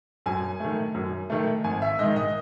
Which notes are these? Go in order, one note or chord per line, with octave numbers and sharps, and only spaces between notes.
F#2 G#5
D#3 A3
F#2
D#3 A3
G#1 G#5
E5
G#2 D#3 D#5
D#5